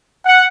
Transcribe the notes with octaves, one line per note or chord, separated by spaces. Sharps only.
F#5